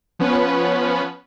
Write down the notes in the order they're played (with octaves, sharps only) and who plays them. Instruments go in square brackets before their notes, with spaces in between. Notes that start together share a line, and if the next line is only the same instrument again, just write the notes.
[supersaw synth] F3 B3 C#4 B4